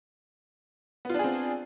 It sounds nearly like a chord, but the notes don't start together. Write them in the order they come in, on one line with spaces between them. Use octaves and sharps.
B3 F4 D4 G#4 C4